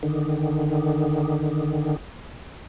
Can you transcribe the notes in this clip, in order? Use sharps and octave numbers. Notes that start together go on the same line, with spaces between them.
D3 D#3